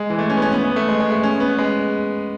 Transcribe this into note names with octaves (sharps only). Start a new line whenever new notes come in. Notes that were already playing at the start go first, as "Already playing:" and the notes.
Already playing: G#3
E3
A3
C#4
B3
C#4
B3
B3
A3
G#3
G#3
A3
C#4
B3
G#3